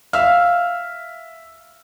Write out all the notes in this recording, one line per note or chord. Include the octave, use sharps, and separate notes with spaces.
E5 F5 E6 F6